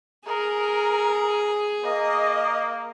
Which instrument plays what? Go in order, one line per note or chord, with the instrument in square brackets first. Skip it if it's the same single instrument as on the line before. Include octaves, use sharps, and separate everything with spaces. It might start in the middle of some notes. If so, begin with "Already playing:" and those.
[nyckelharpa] G#4 [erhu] A#4
[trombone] A#3 [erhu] D#5